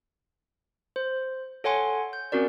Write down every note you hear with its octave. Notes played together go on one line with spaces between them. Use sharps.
C5
A4 C#5 F#5 G#5 C6
G6
C4 C#4 F#4 A#4 D5